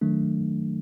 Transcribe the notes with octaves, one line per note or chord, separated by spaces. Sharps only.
D#3 F#3 A3 D4